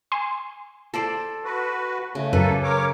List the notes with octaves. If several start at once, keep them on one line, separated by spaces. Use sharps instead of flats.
G#5 C6
A4 C5 D5
F#4 B4
C#3 A3
F#2 A#3 A4 B4
A#4 C#5 D6